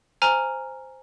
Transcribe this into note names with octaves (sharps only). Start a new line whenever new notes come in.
C5 G#5 A#5 F6